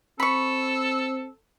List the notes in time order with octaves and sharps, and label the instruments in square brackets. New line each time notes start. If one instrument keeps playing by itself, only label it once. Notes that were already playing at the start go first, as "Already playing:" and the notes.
[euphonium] C4 [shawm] A4 [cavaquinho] B5 C#6